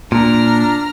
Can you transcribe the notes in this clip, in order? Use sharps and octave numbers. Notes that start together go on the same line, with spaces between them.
A#2 D4 A#5 F6